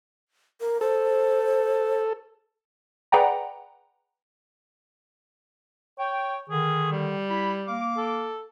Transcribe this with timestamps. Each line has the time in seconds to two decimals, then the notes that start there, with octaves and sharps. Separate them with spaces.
0.61 A#4
0.81 A4 C5
3.12 G#4 B4 D5 F#5 G5 A#5
5.99 C#5 G5
6.50 D3 D#3 G#4
6.92 G3
7.30 E4 B5
7.68 A#3 F5 D6
7.97 A4